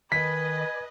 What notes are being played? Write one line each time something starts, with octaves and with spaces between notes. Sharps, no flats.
D#3 B4 D#5 G#5 B6